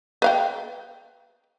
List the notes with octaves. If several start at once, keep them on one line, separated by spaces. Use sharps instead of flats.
B4 F5 G5